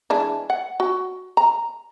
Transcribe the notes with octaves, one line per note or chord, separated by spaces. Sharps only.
E3 G#3 D4
F#5
F#4
A#5